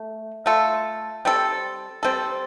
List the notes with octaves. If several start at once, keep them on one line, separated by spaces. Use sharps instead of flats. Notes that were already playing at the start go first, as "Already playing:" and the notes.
Already playing: A3
A3 F4 A4
G3 C4 A4
G3 C4 A4